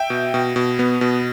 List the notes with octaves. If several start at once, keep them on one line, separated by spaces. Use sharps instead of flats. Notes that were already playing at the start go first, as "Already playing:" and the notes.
Already playing: E5 G5
B2
B2
B2
B3
B2